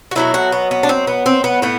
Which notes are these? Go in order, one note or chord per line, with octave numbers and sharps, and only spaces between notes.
F#4
B2 F#3 A3 E4
F#4
B3
B3
D4
C4
B3
C4
B3
A2 B3